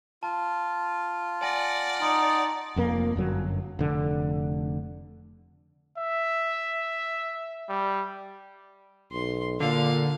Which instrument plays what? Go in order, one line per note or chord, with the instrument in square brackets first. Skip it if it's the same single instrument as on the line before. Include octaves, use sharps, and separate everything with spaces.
[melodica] F4 [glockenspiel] A5
[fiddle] D5 F#5 [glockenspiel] G#5 A#6
[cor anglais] D#4 [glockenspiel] C6 D7
[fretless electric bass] F1 F2 A#3
G1 F#2 F#3
F1 D3
[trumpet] E5
G3
[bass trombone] B1 [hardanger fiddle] C6
[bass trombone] A#2 [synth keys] D3 [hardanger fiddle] F5